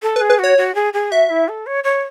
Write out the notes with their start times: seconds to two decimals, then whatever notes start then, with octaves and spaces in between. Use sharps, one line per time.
0.02 A4
0.16 B4
0.21 G#4
0.30 B4
0.39 F#4 C#5
0.58 F#4
0.75 G#4
0.93 G#4
1.11 F#4 E5
1.30 E4
1.48 A4
1.66 C#5
1.84 C#5